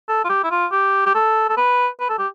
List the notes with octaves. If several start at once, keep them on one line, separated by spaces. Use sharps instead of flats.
A4
F4
G4
E4
F4
G4
G4
A4
A4
B4
B4
A4
G4